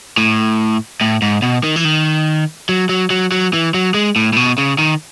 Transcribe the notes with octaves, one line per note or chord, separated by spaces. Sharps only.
A2
A2
G#2
B2
D#3
E3
D#3
F#3
F#3
F#3
F#3
E3
F#3
G#3
A2
A2
B2
C#3
D#3